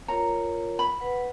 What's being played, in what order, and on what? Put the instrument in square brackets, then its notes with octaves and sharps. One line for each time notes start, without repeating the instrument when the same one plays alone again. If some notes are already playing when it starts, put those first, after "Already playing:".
[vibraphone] F4 A#4 C#5 [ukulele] A#5
[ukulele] B5
[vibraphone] B4 F#5